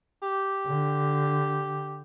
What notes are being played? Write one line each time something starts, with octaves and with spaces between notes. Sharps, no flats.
G4
D3